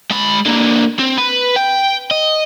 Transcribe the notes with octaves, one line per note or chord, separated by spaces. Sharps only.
G#3 B5
D3 A#3
C4
B4
G5
D#5